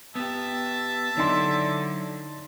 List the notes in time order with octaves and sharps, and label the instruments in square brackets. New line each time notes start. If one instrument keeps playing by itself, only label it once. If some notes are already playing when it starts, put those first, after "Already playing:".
[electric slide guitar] B3 G4 [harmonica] E5 A5
[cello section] D3 [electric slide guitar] F#3 E4 [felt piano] D#4 C6